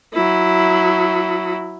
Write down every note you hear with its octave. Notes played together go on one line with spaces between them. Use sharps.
F#3 E4